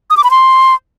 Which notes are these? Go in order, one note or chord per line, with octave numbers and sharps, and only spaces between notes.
D#6
D6
B5
C6